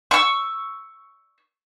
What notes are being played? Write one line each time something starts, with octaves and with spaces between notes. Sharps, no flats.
C#6 E6